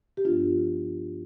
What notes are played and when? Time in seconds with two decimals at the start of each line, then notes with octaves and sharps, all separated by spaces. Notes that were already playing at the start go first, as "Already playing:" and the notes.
0.17 G4
0.25 G2 F3 B3 D4 F4